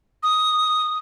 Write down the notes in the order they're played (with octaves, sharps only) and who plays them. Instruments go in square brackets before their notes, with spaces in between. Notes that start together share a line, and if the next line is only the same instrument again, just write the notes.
[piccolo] D#6